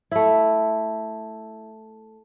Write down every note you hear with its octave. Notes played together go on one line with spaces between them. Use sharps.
A3 E4